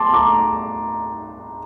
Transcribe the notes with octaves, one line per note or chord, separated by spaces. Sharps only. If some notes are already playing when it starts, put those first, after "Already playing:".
Already playing: A5 C6 D6
A#5 D6